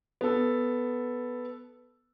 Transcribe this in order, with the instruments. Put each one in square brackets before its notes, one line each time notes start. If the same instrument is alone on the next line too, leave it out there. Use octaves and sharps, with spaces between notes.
[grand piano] B3 A4